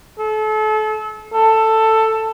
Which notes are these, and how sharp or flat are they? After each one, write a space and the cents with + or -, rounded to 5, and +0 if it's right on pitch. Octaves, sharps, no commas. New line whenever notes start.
A4 -35
A4 +10